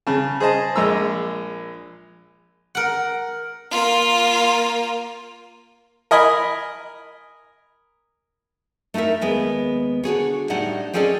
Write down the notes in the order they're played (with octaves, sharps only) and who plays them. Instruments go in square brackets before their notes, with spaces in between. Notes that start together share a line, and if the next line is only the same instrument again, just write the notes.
[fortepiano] C#3 A5
G#4 C5 D#5 A5
A#1 G#3 A#5 E6
[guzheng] A#4 F#5
[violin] A#3 F4
[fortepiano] A#4 D#5 G#5 B5
[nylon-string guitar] A3 D#4 E4 A#4 E5
D#2 G#3 B3
D3 F#4 G#4 C#5
A2 G3 D4 D#4 F#5
C4 C#4 G#4 A4 D5 D#5